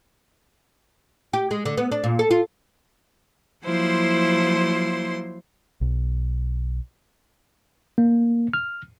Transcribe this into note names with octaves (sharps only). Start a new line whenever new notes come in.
G4
G#3
D3
B3
D4
A#2
A4
F4
F3 F#3 A#3 E4 C5 C6
B1
A#3
F6